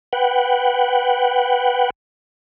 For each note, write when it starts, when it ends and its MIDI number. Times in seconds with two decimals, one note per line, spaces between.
0.13 1.90 71
0.13 1.90 78
0.13 1.90 79